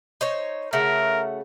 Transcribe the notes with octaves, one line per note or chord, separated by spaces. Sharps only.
D#4 C5 C#5
C#3 A3 F#4 A#4